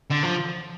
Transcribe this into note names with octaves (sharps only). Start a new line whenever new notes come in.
D3
F3